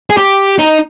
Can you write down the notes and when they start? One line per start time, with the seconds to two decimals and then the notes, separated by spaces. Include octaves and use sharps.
0.10 G#4
0.17 G4
0.58 D#4